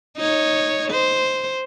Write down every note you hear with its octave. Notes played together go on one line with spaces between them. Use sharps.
D#4 C#5
C5